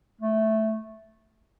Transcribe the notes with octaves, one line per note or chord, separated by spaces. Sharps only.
A3